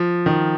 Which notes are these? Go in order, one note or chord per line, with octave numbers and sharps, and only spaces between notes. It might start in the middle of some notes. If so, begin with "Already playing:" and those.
Already playing: F3
D#3